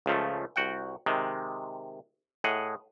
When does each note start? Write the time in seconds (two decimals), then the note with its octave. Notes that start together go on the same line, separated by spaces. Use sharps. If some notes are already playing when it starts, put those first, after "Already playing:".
0.06 C#2 C#3 F3 A3
0.56 C2 F#4 F#5 G5
1.06 C3 D#3 G#3
2.44 A2 G#4 D#5 F#5